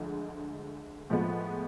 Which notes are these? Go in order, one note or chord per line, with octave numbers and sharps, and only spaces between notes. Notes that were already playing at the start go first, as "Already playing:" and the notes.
Already playing: D2 D3 F3 G#3
A2 F3 G#3 B3